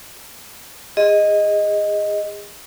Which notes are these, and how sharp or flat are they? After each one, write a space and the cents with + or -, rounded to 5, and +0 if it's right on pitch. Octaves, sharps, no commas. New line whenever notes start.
G#4 -25 D#5 +0